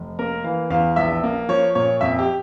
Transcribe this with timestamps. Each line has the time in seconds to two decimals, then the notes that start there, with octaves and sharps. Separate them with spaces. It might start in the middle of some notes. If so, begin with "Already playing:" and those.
Already playing: F1
0.19 A#3 A#4
0.44 E3 F5
0.70 E2 F5
0.96 A#1 E5
1.23 A#3
1.49 F3 C#5
1.75 A#2 C#5
2.01 F2 E5
2.19 G4